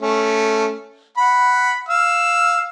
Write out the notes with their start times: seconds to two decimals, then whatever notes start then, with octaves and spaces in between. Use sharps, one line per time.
0.01 A3 C#4
1.17 F#5 B5
1.89 F5 E6